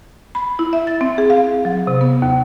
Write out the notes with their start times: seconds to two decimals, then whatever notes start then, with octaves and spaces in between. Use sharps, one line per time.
0.35 B5
0.59 E4
0.73 E5
0.87 A6
1.01 C4
1.18 G#4
1.30 F5
1.65 F#3
1.87 C3
2.01 B3
2.22 D#2